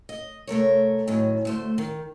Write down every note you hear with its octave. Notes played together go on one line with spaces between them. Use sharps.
D#5
C3 A3 A#4 C#5
A2 D#3 F#3 C#4
D2 A3 C5
D#3